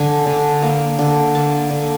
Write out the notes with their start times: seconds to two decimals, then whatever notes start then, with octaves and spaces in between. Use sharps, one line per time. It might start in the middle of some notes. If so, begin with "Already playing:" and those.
Already playing: D3 G#5
0.27 D3
0.62 A#3
0.99 D3
1.35 A#3 A5
1.70 D3